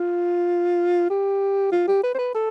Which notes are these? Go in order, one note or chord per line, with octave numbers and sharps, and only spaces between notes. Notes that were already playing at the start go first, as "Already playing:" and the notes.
Already playing: F4
G4
F4
G4
B4
C5
B4
A4